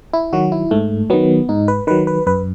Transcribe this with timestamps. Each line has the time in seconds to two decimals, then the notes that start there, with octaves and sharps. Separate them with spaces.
0.13 E4
0.33 D#3 F#3 F#4
0.52 E4
0.71 G#2 A3
1.10 D#3 F#3 B3
1.49 G#2 D#4
1.68 B4
1.87 D#3 F#3 B4
2.07 B4
2.26 F#2 B4